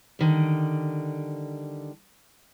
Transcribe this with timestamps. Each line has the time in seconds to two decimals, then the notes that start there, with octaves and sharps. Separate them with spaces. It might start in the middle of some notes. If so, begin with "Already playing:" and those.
0.19 D3 D#3 G3